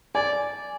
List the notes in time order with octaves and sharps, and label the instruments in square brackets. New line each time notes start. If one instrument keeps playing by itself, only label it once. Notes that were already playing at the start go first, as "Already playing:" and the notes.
[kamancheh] D5 [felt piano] G#5